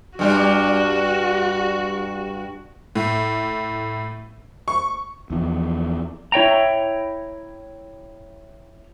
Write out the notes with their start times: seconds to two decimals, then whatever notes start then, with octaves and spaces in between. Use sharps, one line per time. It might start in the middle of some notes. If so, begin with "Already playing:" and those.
0.19 G2 G3 D4 F#4
2.95 A2
4.68 C#6
5.30 E2 F3
6.32 E4 C#5 G5 A#5